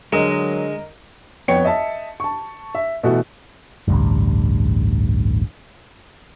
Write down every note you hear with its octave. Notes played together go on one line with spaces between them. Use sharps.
D3 F#3 G#3 A#4 D#5
F2 B3 C#5 G5 C#7
D#5 E5 A5
A5 C#6
E5
B2 E3 A3 F#4
A1 D2 G2